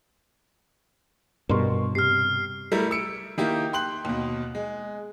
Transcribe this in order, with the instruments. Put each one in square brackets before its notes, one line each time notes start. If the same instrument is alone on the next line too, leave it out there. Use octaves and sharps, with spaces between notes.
[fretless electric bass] G2 B2 [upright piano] A#4 C6 C#6
[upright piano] C3 [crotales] F6 C7
[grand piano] G3 A3 E4 A#4
E6 C#7 D7
D#3 A#3 E4 G4
G5 C6 F#6 F#7
D#2 B2
G#3